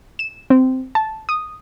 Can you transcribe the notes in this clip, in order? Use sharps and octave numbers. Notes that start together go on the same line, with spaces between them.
E7
C4
A5
D#6